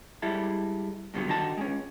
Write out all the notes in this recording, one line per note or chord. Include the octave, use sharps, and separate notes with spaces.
G3 G#3 E4 A4
G2 B2 D3 E3 F#3
D3 D#3 D#4 F#4 A5
G#3 C#4